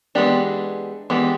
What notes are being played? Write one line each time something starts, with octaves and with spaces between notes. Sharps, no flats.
E3 G#3 B3 D4 G4
E3 G#3 B3 D4 G4